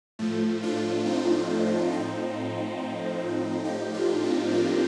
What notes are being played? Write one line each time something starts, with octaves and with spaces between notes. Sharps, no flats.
A2 F3 A3
D4 F4
C4 D#4
A2 F3 C4 D#4
A2 F3 D#4 G4
D4 F4
C4 D#4
A#3 D4